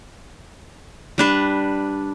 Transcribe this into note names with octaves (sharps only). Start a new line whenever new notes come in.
G3 D4 B4